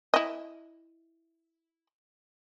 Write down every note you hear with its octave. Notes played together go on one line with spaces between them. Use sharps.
E4 D#5